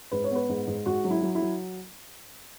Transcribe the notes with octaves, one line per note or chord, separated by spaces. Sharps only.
G#2 B4
C#5
B3 B4
G#2
G#2
G#2 F#4
F#3
E4
F#3
E4
F#3